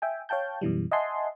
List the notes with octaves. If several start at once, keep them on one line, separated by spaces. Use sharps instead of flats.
E5 G5 G#5
C#5 F5 G5 A5 G6
F#2 B2 E3 G3
D#5 E5 F#5 G#5 A5 C6